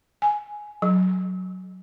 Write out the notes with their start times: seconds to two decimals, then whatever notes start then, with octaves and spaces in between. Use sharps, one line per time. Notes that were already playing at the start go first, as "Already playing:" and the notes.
0.22 G#5
0.82 F#3